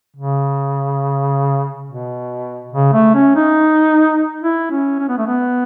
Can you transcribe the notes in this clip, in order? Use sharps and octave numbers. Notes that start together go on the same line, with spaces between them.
C#3
B2
C#3
A3
C#4
D#4
E4
C#4
C#4
B3
A3
B3